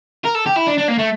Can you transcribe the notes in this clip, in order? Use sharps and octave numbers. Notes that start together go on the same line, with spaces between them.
A#4
A4
G4
E4
D4
D4
A#3
A3